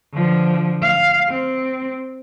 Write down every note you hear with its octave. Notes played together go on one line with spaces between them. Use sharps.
D3 F3
F5
C4